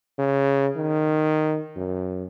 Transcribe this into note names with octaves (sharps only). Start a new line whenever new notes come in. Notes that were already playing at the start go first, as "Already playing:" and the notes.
C#3
D#3
F#2